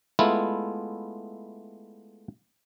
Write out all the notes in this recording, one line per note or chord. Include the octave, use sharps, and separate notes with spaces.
G#3 A3 B3 E4 F4